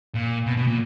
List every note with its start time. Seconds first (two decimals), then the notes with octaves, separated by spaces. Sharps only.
0.15 A#2
0.47 B2
0.57 B2
0.67 A#2